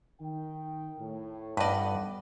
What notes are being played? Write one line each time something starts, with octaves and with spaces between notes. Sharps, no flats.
D#3 G5
A2
A1 G2 B3 B4 D5 D#5 F#5